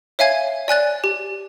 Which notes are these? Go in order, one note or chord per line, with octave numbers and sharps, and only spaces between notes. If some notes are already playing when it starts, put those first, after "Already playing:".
C#5 E5 F5 G#5 G#6
D5 G#5 F#6 A6
G4